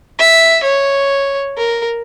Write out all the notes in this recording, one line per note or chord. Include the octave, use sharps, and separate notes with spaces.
E5
C#5
A#4